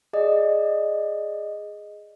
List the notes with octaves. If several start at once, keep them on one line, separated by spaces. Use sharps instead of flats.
G#4 D5 D#5